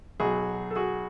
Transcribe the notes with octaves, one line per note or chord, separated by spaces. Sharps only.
B1 B2 F#3 F#4 G#4
A4
F#4 G#4